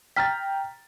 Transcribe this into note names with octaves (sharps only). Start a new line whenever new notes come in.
G5 A#5 F6 A6 B6